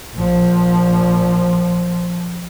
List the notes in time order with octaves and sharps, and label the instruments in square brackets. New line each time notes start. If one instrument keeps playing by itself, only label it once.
[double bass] A#1 F3